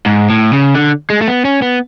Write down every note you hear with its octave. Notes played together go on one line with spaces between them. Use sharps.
G#2
A2
C#3
D3
G#3
A3
B3
C#4
B3